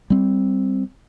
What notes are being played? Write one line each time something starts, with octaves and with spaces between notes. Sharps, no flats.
G3 C4